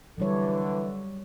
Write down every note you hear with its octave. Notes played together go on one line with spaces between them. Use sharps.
D3 E3 F#3 G3 C#5